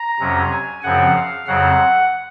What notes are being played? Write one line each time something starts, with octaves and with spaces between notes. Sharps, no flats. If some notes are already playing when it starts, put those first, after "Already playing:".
Already playing: A#5
F2 C3 F#3 C#4
G#5
F#2 C#3 F3 C4 F#5
F5
F2 C#3 F#3 C4 F#5